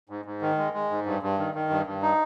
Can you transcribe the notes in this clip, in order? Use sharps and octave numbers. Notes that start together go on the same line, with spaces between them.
G#2
G#2
D#3
G#3
G#3
G#2
G2
G2
D#3
D#3
G2
G2
D#4